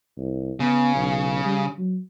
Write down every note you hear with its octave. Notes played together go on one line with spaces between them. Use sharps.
C2
C#3 B3
B1
G3
F#3